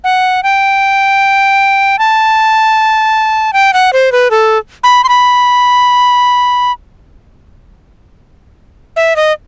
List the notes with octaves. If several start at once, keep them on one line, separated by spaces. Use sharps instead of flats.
F#5
G5
A5
G5
F#5
C5
B4
A4
B5
C6
B5
E5
D#5